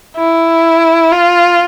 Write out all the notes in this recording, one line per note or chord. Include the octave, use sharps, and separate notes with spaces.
E4
F4